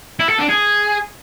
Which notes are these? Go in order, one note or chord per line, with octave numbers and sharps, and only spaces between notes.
E4
A4
D4
G#4